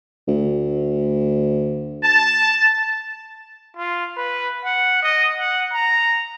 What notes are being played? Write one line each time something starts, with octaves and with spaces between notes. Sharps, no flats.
D2
A5
F4
B4
F#5
D#5
F#5
A#5